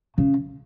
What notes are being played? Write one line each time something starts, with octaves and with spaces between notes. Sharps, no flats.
C#3